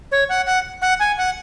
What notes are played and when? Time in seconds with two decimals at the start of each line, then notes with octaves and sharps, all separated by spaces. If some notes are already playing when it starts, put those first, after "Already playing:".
0.12 C#5
0.29 F#5
0.46 F#5
0.82 F#5
1.00 G#5
1.18 F#5